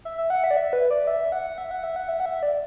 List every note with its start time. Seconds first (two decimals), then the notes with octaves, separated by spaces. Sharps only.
0.05 E5
0.18 E5
0.30 F#5
0.44 E5
0.51 D5
0.57 E5
0.73 B4
0.90 D5
1.07 E5
1.32 F#5
1.58 E5
1.71 F#5
1.84 E5
1.96 F#5
2.09 E5
2.20 F#5
2.26 E5
2.43 D5